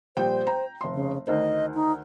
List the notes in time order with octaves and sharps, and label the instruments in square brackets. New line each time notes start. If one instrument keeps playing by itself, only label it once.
[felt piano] A#1 G3 G5 [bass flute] C5
[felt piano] G5 A#5
F1 C6
[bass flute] C#3
[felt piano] D2 D#3 C5 [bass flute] D#5
[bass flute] D#4